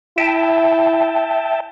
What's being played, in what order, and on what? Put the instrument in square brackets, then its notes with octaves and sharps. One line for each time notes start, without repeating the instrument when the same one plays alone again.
[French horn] E4 [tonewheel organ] E5 G5 A5